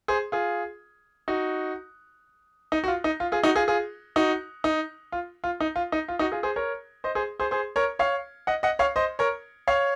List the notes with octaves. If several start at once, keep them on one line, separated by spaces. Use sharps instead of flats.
G#4 C5
F4 G#4
D#4 F#4
D#4
F#4
F4
D#4
F4
F4 G#4
D#4 F#4
F4 G#4
F4 G#4
D#4 F#4
D#4
F4
F4
D#4
F4
D#4
F4
D#4 F#4
F4 G#4
G#4 C5
A#4 C#5
C5 D#5
G#4 C5
G#4 C5
G#4 C5
A#4 C#5
C#5 F5
D#5 F#5
D#5 F#5
C#5 F5
C5 D#5
A#4 C#5
C#5 F5